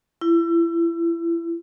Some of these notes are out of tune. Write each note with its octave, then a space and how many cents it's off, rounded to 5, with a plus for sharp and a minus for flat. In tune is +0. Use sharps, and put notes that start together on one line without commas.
E4 +30